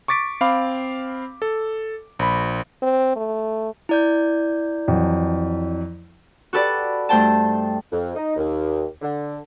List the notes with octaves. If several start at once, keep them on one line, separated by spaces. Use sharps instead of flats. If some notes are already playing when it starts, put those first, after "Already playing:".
C#6 D6 A6 B6 D7
C4 F5 B5 D6
A4
A#1 B5
C4
A3
E4 D5 G6
F2 E3 F#3
F#4 G4 A4 B4 D5
G2 A3 C5 G5 A5
F2
D#4
D#2
D3